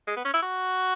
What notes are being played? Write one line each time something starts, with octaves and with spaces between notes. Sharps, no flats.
G#3
B3
C#4
E4
F#4